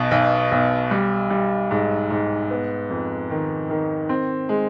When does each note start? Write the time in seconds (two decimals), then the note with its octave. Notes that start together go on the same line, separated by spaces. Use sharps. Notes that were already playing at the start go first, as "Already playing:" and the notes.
Already playing: B1 B2
0.11 B1
0.51 B1
0.91 G3
1.30 G3
1.71 G#2
2.10 G#2
2.50 B3
2.90 F2
3.30 D#3
3.70 D#3
4.09 C4
4.49 G#3